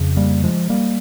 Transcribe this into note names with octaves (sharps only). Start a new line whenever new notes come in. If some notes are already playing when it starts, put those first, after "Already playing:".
Already playing: F2 C#3
G3 A#3
F3 G#3
G3 A#3